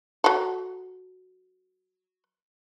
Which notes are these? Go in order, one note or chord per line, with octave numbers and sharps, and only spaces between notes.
F#3 A4